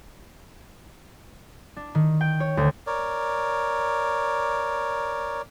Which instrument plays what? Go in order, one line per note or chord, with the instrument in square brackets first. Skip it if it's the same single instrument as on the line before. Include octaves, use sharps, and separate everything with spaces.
[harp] D4
D#3
G5
C#5
D2
[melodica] A#4 C#5 D5